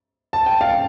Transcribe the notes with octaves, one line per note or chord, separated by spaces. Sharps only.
A5
G5
F5 A5